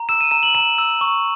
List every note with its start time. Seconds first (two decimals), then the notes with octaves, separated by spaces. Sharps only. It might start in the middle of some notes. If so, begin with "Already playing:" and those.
Already playing: A#5
0.09 E6 E7
0.21 D#7
0.31 A#5 E7
0.43 F#7
0.55 A#5 E7
0.78 E6
1.01 C#6